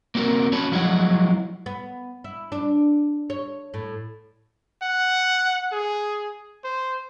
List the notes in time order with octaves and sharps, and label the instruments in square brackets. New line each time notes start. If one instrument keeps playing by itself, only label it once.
[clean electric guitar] A#3 C4 F#4 A4 A#4
C#4 F#4 C#5 A5 B5
F3 F#3 G#3 E4 F#5
[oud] B3
E4
D4
C#5
A2
[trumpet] F#5
G#4
C5